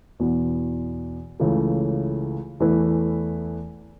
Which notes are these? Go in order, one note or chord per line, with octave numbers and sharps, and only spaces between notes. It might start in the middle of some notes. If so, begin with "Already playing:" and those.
E2 B2 B3
C#2 C#3 E3 A3
E2 E3 A3 E4 B4